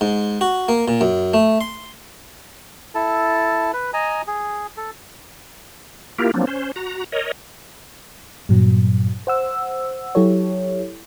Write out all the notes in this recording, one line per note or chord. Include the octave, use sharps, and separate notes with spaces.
G#2
F#4
A#3
A#2
F#2
A3
C6
E4 A4 A5
B4
D#5 G#5 A#5
G#4
A4
A#3 E4 F4 G4 A#4
F3 F#3 A#3 C4 D4
C#4 C5
F#4 A#5
A#4 C#5 D#5
G2 A#2 F#3
C5 F#5 E6
F#3 E4 G4 A4 C#5